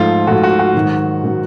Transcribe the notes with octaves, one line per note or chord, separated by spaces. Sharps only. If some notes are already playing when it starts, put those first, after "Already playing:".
Already playing: G#2 F3 A3 F4
G#2 F3 A3 F#4
F#4
F#4
G#2 D#3 F#3
D#3 F#3